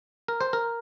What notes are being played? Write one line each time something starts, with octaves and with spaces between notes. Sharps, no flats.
A#4
C5
A#4